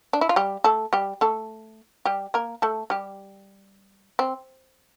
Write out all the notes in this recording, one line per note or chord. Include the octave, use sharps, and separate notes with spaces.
D4
E4
F4
G3 G4
A3 A4
G3 G4
A3 A4
G3 G4
A#3 A#4
A3 A4
G3 G4
C4